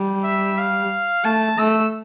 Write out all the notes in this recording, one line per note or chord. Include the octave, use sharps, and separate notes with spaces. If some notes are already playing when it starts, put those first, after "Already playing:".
Already playing: G3
E5
F5
A3 A5
A3 E6